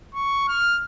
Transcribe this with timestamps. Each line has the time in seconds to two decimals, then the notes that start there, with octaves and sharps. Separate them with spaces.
0.14 C#6
0.48 F6